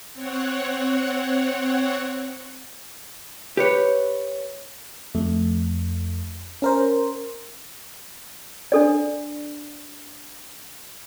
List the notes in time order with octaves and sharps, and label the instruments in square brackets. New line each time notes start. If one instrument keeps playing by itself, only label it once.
[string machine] C4 C#5 F#5
[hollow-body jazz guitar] G4 B4 C#5
[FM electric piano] F2 A3
C#4 A#4 C5
[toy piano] D4 A4 D5